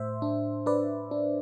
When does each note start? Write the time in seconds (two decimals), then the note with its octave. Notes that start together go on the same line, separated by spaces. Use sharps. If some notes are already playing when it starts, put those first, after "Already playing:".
Already playing: A2 C5 E5
0.22 D4
0.66 D4 B4 D5
1.11 D4